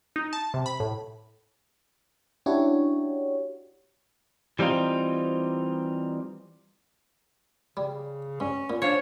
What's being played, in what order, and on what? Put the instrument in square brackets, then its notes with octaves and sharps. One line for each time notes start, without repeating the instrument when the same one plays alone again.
[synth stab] D#4
A5
C3
B5
A2
[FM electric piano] C#4 D4 E4 F#4 G4 C#5
[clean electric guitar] E3 G3 C4 D#4 F4
[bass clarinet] C#3 [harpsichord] G3
[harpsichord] G2 [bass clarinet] C#4
[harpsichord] A#2
[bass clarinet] D4 [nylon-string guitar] C5 F5 [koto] C#5